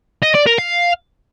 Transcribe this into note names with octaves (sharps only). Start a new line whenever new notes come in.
D#5
D5
A#4
F5